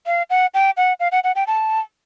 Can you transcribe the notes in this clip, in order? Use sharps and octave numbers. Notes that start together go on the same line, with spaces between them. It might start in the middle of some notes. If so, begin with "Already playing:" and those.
F5
F#5
G5
F#5
F5
F#5
F#5
G5
A5